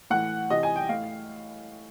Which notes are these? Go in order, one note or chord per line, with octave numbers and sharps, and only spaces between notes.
A2 E3 F#5
C3 E3 D#5
G#5
G5
A2 F5